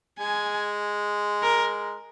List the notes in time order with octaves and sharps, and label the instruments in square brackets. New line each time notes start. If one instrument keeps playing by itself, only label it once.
[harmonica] G#3 [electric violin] G#5
[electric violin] A#4